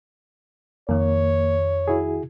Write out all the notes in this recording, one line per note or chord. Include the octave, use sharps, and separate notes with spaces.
F2 D#3 A#3 C#5
E4 F#4 G#4